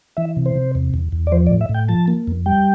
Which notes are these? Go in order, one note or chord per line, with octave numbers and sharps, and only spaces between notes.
E3 E5
C3
C5
C3
E2
E2
E2
D5
F3 C5
D5
A2
E5
A2
G5
F3 A5
A#3
F2
G3 G5